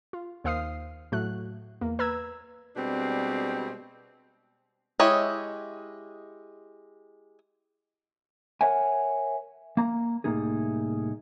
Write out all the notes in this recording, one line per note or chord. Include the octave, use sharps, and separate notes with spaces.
F4
D#2 C5 F5 D#6 F6 C7
A2 F#3 A3 F#4 F#6
E2 A#3
B4 A#5 E6 G#6
B2 G3 G#3 C4 D4
G#3 E4 G4 C#5 D#5
A#4 C#5 E5 F#5 G#5
A#3 A#5
C2 A2 A#3 D#4 G#4